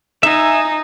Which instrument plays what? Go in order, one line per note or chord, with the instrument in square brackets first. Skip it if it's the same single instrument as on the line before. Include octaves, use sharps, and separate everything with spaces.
[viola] D#4 [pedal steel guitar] E5 G#5